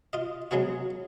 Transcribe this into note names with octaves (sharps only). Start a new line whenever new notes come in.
F4 D#5
C#3 F#3 G#3 B3 F#4